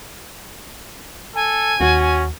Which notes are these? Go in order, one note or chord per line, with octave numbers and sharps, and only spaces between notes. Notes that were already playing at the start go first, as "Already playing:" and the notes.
A4 G#5
D#2 C#4 F#4